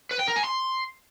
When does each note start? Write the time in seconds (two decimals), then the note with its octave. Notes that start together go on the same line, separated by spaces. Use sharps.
0.11 B4
0.19 G5
0.28 A#4
0.36 G#5
0.44 C6